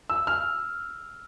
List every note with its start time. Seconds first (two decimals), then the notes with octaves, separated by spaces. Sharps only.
0.10 E6
0.27 F6